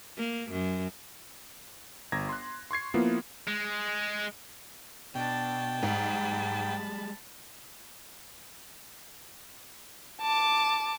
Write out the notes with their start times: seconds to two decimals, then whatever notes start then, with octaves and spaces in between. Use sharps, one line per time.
0.17 A#3
0.51 F#2
2.12 G1 A#5 G#6 A#6
2.29 C6 F#6
2.71 C6 C#6 G#6 C7
2.94 F3 A#3 B3 E4 F4
3.48 G#3
5.15 B2 D4 G5 A5
5.83 G#2 G3 G#3 A5 B5
10.21 A5 D6